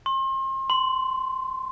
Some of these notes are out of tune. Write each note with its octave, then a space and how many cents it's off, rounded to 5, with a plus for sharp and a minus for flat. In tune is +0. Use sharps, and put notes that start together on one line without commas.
C6 +35
C6 -15